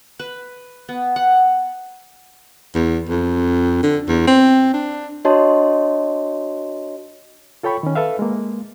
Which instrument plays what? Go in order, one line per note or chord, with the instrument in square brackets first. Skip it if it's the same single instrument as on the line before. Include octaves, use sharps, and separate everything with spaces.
[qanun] B4
B3
F#5
[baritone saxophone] E2
F2
D3
E2
C4
D4
[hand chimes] D4 F#4 C#5 D#5 A5 C6
[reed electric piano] F4 A4 C#5 G5 B5 C#6
D#3 C#4
A4 B4 E5 F5
G#3 A#3